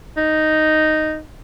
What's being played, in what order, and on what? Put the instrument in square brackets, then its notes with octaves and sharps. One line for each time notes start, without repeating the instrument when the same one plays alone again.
[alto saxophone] D#4